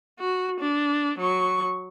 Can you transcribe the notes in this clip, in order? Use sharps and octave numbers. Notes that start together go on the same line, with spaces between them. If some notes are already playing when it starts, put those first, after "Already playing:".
F#4
D4
F#3 C#6